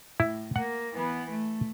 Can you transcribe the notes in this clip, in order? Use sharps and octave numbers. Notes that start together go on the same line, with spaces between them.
A2 E4
A#3 F#5
E3 B3
A3